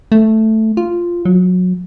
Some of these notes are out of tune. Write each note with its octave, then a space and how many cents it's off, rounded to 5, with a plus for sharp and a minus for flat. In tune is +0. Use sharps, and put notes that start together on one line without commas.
A3 +0
F4 -5
F#3 -25